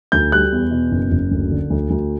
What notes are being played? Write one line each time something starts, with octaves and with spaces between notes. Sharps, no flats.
D2 G6
G3 F#6
E2
B2
F#1
F#1
D2
D3
D2
D2